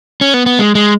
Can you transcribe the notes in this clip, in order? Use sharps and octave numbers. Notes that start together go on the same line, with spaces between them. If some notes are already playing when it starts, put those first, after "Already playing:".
C#4
B3
B3
G#3
G#3